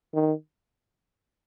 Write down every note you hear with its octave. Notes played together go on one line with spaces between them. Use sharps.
D#3